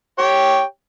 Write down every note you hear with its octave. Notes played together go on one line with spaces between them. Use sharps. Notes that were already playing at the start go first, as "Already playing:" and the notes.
G4 C#5 G5